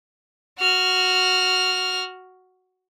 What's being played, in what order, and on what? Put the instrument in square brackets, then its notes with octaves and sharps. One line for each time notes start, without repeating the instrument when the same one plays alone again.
[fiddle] F#4 F6